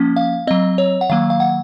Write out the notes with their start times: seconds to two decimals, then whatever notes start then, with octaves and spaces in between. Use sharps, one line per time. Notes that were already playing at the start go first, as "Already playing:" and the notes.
Already playing: F3 A#3 C#4
0.16 F5
0.47 F#3 C4 D#5
0.78 C#5
1.01 F#5
1.10 D#3 F#3 A#3 F5
1.30 F5
1.40 F#5